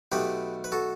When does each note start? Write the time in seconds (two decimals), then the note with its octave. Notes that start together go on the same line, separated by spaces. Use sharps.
0.12 B1 B2 A3 G4 B4
0.64 B4
0.72 F#4 A4